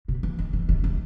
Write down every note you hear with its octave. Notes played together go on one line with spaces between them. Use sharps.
B2
E3
D#3
E3
D#3
E3